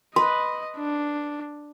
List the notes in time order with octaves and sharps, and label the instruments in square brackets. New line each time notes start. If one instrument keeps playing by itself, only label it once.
[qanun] B4 [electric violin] D#5 [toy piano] C6
[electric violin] D4